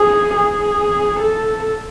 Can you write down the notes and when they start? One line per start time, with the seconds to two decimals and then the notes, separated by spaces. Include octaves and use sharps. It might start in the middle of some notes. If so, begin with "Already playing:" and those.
Already playing: G#4
0.36 G#4
1.20 A4